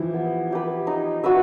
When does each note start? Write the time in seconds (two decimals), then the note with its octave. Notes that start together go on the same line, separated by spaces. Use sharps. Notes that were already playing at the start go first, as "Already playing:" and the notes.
Already playing: E3 F3 E4 G4
0.14 B3
0.51 E4 G4 B4
0.87 D#4
1.23 F#4 B4 E5